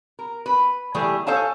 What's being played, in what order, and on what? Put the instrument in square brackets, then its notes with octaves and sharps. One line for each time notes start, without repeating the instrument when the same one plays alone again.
[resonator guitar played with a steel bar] A#4
B4
E3 G3 A3 G#4
A4 C5 C#5 F5 G#5 A5